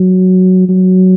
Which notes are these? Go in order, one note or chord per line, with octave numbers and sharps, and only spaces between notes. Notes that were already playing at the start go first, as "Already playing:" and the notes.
Already playing: F#3
F#3